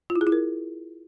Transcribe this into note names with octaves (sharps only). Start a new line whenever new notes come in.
F4
E4
G#4
E4
A#4